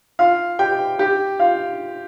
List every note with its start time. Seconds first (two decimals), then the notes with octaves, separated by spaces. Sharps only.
0.19 F4 F5
0.59 G4 G5
0.99 G4 G5
1.40 F4 F5